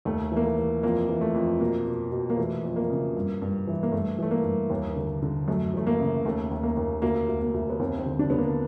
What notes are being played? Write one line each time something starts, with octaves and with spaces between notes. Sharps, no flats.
D#2 A3
E3 A#3
A3
E3
F2 A#3
E3
A3
F2
B2 A#3
B2
B2
A#3
E3 A3
F2
A#3
C#3
G2
G2
E3
A#3
G2 A3
E3 A3
A#3
G2
D#2
D3
D3
F#2 A3
E3 A3
A#3
C#3
D#2 A3
D#2
A#3
D#2
D2 A#3
D2
A#3
D2
B3
D#2 C4
C4
D3
D4
D3 B3
A#3